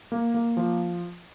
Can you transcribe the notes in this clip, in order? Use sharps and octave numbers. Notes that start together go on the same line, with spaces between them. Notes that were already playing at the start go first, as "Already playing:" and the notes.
A#3
A#3
F3